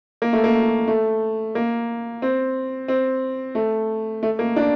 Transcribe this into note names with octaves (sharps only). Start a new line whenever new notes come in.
A#3
A3
A#3
A3
A#3
C4
C4
A3
A3
A#3
D4